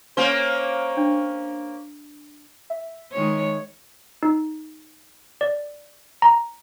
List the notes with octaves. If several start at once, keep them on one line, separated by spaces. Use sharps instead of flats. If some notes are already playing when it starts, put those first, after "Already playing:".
A#3 C#4 C5
D4
E5
D#3 G#3 C#5
D#4
D5
A#5